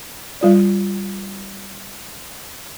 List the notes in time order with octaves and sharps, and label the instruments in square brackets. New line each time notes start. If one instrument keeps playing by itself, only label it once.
[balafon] G3 F4 D5